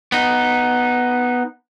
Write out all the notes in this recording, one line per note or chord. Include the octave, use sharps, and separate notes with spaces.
B3 D#4